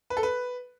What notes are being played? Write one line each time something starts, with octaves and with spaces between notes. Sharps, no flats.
B4
A4
B4